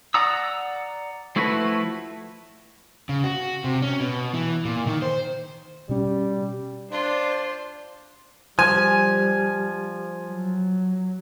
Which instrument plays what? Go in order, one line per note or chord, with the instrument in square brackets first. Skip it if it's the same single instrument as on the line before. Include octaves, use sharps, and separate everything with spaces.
[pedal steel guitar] D5 F#5 A#5 D#6 E6
F3 A3 E4 F#4 B4
[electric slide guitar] C#3
F#4
C3
C#4
B2
E3
A#2
D#3
C5
[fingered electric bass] B2 C#4 [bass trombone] G3
[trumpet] D4 [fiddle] F4 C6 [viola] C5 [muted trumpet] D5
[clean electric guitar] F3 [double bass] G3 [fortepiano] G#5
[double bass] F#3